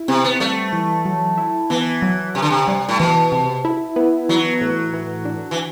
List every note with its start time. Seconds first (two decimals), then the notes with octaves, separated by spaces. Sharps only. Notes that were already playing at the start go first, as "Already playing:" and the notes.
Already playing: E4
0.08 C3 C4
0.24 B3
0.40 G3 A3
0.73 E3
1.05 F#3
1.38 E4
1.70 E3 B3
2.02 F#3
2.35 C3 D4
2.42 D3
2.50 C3
2.68 G3
2.89 A2
3.00 B2 E3
3.32 C3
3.65 E4
3.96 B3
4.29 E3 F#3
4.61 A2
4.93 E3
5.25 D4
5.51 E3